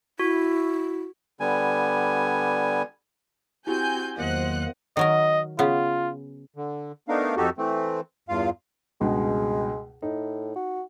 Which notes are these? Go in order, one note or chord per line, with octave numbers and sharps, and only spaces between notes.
E4 F#4
D3 G3 B3 G#5
C4 E4 F#4 G4 G#5 G6
E2 D#3 F#3 A#3 C5 D#5 F#5 F#6
D#3 F#3 A#4 D#5
C#3 B3 F4
D3
A3 B3 D4 D#4 A#4 F5
F2 D#4 F#4 G4 A4
E3 A3 C4
E2 G2 F4 F5
C#2 G2 B2 G#3
A2 D#4
F#4